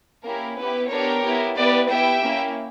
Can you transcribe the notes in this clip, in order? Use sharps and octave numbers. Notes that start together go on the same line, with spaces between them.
A#3 C#4 E4 G4 A#4
B3 E4 G4 B4
B3 D4 G4 A#4 C#5
B3 E4 G4
B3 E4 G4 B4 D5
B3 E4 G4 E5 G5
A#3 C#4 E4